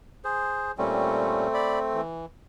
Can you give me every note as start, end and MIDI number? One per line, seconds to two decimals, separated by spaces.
0.24 0.72 68
0.24 0.72 72
0.78 1.47 46
0.78 1.47 55
0.78 2.01 57
0.78 2.01 60
0.78 1.47 61
1.54 1.79 74
1.54 1.79 83
1.94 2.26 52